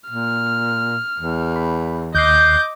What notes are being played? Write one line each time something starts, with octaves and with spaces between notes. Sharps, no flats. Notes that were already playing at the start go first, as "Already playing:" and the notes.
A#2 F6
E2
B5
D#2 D#5 D6 F#6 G6 C7